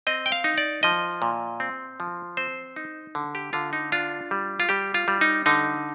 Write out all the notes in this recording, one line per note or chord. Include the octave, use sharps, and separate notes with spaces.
C4 D#5
G5
F5
D#4
D5
F3 D#5
A#2
C4
F3
C4 C5
D#4
D3
G4
D3 F4
D#4
D4 F4
G3
F4
G3 G4
F4
G3
D#4
D3 D#4